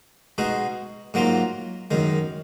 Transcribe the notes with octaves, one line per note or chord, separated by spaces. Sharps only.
B2 G#3 D#4 F#4
G#2 F#3 A#3 F4
F#2 D#3 G#3